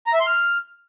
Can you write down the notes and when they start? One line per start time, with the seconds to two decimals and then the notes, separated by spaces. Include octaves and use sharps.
0.07 A#5
0.13 E5
0.20 C6
0.27 F6